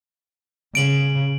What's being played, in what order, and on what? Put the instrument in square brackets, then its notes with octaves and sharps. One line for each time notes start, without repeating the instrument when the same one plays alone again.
[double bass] C#3 [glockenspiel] D7 F#7